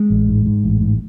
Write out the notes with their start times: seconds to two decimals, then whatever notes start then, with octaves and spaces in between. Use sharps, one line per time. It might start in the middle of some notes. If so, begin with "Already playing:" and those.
Already playing: G#3
0.10 A1
0.29 G#2
0.46 G#2
0.64 A1
0.81 G#2